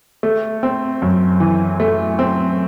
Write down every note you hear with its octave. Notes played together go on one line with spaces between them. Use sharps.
A3
C4
F#2
E3
A3
C4